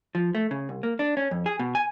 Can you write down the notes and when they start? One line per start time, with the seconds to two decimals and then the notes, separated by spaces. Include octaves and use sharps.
0.15 F3
0.35 A3
0.51 C#3
0.69 C2
0.83 A#3
0.99 D4
1.17 C#4
1.31 F2
1.46 G#4
1.59 B2
1.75 G#5